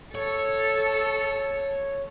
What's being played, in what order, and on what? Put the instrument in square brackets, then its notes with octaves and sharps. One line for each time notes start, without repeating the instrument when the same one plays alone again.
[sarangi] A4 [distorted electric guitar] C#5